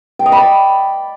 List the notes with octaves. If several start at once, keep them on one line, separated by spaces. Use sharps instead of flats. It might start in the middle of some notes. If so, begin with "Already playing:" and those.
G5
D#5
B5
D5